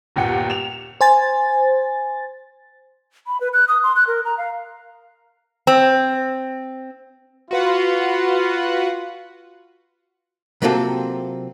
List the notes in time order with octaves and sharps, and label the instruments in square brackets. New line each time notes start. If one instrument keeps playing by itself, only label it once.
[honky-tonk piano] G1 D#2 A#2 G4 F#5
E7 F7
[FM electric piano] C5 G#5 A6
[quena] B5
B4
F#6
D#6
C6
F#6
A#4
A#5
F5
[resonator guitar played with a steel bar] C4
[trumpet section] F4 [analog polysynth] F#4 B4 F#5
[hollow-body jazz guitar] C3 F#3 A#3 C4 F4 A4